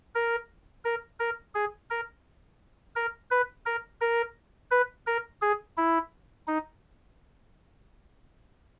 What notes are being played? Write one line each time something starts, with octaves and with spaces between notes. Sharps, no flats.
A#4
A#4
A#4
G#4
A#4
A#4
B4
A#4
A#4
B4
A#4
G#4
E4
D#4